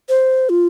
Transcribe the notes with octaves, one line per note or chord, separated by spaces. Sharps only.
C5
F4